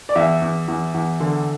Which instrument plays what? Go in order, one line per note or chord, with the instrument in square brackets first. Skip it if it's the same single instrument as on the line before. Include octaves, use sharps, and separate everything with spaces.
[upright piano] D5
E2 E5
E2
E2
E2
D3